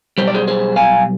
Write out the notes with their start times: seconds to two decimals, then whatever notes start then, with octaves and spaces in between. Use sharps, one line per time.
0.18 B1 B2 G3 C5
0.27 D5
0.35 G#4 C5
0.48 G#4 C5
0.76 F5 G#5